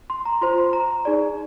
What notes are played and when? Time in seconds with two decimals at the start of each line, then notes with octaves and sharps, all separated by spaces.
0.10 C6
0.25 A#5
0.41 F4 C5 C6
0.58 C6
0.73 A#5
1.05 D#4 G#4 D5